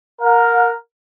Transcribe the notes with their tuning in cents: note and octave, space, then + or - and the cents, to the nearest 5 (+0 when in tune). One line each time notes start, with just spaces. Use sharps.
A#4 +0 F#5 -40